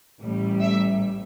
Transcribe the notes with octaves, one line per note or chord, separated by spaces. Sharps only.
A1 A2 G3
E5